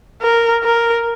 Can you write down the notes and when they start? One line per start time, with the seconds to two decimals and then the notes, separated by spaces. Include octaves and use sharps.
0.22 A#4
0.64 A#4